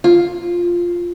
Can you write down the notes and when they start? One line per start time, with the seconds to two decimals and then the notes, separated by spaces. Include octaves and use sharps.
0.04 F4